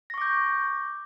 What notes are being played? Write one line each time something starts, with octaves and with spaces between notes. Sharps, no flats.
C#6 D6 G6 A#6